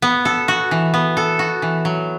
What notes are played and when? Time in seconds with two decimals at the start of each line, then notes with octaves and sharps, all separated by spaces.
0.02 B3
0.25 A4
0.48 F#4
0.71 E3
0.94 B3
1.17 A4
1.39 F#4
1.62 E3
1.85 F#3